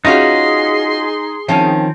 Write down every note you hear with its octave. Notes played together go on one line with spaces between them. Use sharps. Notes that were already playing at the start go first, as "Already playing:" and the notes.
C#4 D#4 F4 F#4 G#4 C6
D#3 F3 C4 C#4